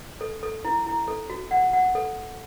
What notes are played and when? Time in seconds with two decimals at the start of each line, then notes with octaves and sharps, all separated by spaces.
0.21 A4
0.43 A4
0.65 E4
0.86 E4
1.08 A4
1.30 F#4
1.51 F#5
1.73 F#5
1.95 A4